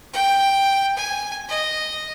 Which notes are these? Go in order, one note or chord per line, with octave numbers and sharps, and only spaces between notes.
G5
G#5
D#5